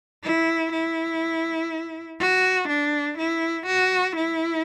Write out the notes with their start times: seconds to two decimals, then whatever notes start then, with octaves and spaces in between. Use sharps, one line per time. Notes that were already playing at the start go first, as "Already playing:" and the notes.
0.24 E4
0.73 E4
2.20 F#4
2.69 D4
3.19 E4
3.67 F#4
4.16 E4